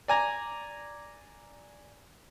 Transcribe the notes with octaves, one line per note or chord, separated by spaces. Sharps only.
D5 G#5 A#5